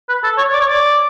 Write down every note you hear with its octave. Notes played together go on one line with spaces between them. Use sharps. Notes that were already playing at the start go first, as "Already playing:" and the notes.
B4
A4
C#5
D5
C#5
D5